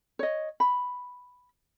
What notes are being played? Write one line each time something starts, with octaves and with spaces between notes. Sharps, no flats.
C#5 D#5
B5